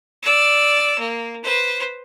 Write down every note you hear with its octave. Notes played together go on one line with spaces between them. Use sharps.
D5 E6
A#3
B4 C5